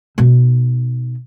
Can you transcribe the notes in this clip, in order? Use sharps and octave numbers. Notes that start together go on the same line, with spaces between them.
B2 D#4